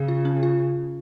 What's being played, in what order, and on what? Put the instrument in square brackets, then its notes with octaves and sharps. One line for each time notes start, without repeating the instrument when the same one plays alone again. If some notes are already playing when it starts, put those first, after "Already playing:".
Already playing: [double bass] C#3 [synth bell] G#4
[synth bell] F4
C#4
F4